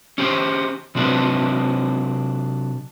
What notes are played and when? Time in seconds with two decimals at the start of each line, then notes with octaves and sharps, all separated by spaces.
0.18 C#4 G4 C5
0.95 C3 F#3 C4 D4 A4 B4